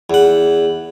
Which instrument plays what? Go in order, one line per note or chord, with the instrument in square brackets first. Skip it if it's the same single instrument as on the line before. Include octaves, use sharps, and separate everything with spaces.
[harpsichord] E2 F#5